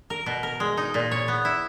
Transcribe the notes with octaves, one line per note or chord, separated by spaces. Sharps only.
A#4
B2
A#4
G#3
D#4
A#2
C#5
B3
E4